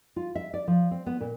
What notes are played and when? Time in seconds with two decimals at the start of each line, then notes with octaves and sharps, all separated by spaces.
0.16 F4
0.35 E5
0.54 D5
0.67 F3
0.91 C4
1.06 B3
1.20 A#2